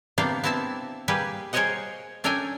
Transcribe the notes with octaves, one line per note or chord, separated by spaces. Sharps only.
C3 A#3 B3 D4 F5 G5
B3 C4 E4 E5 A5
G3 A#3 G4 G#4 B4
G#4 A#4 C5 C#5 D#5 F#5
C#4 D4 A4 A#4 G5 G#5